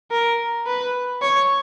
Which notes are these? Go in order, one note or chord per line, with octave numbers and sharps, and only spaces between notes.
A#4
B4
C#5